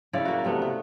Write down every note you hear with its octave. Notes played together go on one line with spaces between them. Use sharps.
C#3 E4 C#5 D5
A#3 F#4
C3 A3 B3
B3